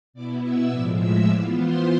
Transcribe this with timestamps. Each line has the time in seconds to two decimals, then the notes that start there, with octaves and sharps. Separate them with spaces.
0.13 B2 B3 E4 D5 D6
0.42 E5 E6
0.70 A2 F3 G#3 D5 D6
0.98 E5 E6
1.27 E3 B3 F4 D5 D6
1.55 C5 C6